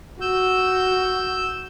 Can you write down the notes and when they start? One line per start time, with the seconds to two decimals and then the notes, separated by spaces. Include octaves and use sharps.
0.21 F#4 E6 G6